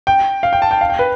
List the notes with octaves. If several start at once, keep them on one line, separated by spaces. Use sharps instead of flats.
G5
F5
G5
A5
G5
F5
G5
B4